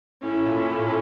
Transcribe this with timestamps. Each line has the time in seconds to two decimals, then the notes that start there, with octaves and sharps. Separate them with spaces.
0.22 A2 C#4 E4 A4
0.46 A#2
0.71 A#2